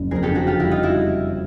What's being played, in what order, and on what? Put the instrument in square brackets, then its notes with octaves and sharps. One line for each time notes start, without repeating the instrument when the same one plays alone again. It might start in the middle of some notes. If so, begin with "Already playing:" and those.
Already playing: [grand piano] F#1
[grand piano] F2 [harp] G#4 A#4
[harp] G4 A4
[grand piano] D3
[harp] F#4 G#4
[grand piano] F2 [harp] F4 G4
[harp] E4 F#4
[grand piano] G3
[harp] D#4 F4
E4 F#4